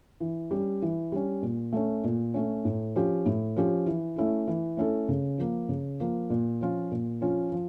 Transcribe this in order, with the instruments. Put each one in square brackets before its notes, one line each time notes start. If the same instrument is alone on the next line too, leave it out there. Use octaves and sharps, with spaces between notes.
[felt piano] E3
G3 C#4
E3
G3 C#4
A#2
A3 C#4
A#2
A3 C#4
A2
F3 C#4 G4
A2
F3 C#4 G4
E3
A3 C#4 E4 A4
E3
A3 C#4 E4 A4
C#3
F3 A#3
C#3
F3 A#3
A#2
F3 C#4 F4
A#2
F3 C#4 F4
F3